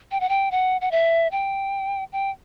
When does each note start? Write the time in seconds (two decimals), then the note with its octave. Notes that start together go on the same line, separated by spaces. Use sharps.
0.12 G5
0.20 F#5
0.29 G5
0.51 F#5
0.81 F#5
0.91 E5
1.32 G5
2.12 G5